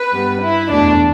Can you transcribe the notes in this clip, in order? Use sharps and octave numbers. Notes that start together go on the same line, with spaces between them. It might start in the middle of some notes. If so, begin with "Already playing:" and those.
Already playing: B4
G2 G3 B3
E4
E2 B2 A3 D4